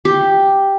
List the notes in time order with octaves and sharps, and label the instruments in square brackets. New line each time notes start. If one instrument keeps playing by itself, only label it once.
[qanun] G4